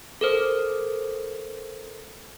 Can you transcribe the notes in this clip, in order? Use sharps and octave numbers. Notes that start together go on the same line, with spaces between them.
A4 A#4 C5